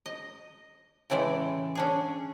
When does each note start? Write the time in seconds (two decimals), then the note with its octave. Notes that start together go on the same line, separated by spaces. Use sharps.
0.06 D#5
1.10 A2 C#3 E3 G#3 D5
1.75 C#4 D4 G#4